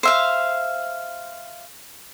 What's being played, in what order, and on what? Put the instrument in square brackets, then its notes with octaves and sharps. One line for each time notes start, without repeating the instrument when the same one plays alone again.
[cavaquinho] C5 E5 F5